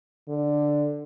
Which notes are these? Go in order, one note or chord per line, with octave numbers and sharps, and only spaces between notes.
D3